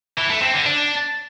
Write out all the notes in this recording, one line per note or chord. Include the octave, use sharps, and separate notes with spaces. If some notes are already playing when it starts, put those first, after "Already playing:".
E3
A3
C4
D3
D4